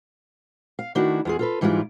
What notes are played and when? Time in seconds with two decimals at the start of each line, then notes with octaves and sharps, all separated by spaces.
0.79 F5
0.95 D#3 A3 D4 E4 F#4
1.25 E2 F4 G#4
1.39 F4 A4 B4
1.61 G#2 E3 G3 G#3 E4 F4